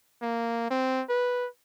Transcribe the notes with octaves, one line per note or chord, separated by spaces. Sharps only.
A#3
C4
B4